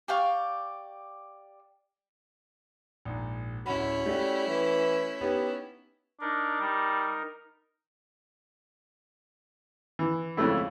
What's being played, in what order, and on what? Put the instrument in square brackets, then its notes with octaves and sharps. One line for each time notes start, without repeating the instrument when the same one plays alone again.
[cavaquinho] G4 D5 F5 C#6
[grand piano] A#1 G#2
[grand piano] D1 F#5 B5 [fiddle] C#4 E4 [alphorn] F#4
[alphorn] G3 [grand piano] A3 F#4
[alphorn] E3
[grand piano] B3 D#4 C#5 [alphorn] G4
[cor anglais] D4 [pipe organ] D#4 A#4
[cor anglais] G3
[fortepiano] E3
F2 C#3 G#3 A3 E4